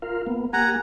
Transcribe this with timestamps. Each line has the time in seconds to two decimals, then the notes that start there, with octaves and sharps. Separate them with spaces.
0.02 F4 A#4 F5
0.27 A#3 B3
0.53 A#3 G4 F#5 G#5 A#5